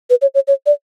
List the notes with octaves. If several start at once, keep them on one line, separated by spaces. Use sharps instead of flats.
B4
C#5
C#5
C#5
D5